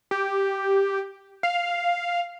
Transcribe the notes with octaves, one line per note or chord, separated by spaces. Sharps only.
G4
F5